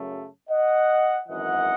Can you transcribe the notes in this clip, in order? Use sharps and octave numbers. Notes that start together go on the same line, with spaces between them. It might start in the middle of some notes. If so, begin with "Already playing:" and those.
Already playing: F#2 C#3 F#3 A3
D#5 F#5
G#1 F#2 E3 D#5 F#5